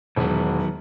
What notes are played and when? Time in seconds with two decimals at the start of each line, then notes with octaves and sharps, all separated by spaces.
0.16 E1 D#3 F#3 B3